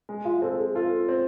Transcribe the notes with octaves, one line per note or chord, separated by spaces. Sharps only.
G#3
F4
C4 A4
G#4
F4 A4
C4